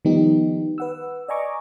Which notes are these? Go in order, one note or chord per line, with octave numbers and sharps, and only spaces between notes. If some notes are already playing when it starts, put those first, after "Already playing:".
D#3 F3 G3 B3 D#4 G4
B4 F#5 E6
D5 D#5 G#5 A#5 C#6 D6